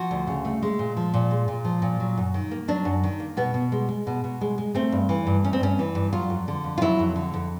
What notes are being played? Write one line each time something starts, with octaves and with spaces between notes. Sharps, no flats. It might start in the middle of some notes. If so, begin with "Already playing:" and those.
Already playing: F3 F#4
D2
C#3
A3
G#3
A#2
F3
A#2
G#3
A#2
F3
A#2
F#3
F#2
D#3
A#3
F#3 D4
F#2
D#3
A#3
B2 B3
B2
G#3
G#3
B2
B2
G#3
G#3
A3 C4
G2
E3
G2
A3 C#4
C4
G2 C#4
E3
G2
F#3 F4
F2
D3
F2
F4
F#3 E4
F2
D3
F2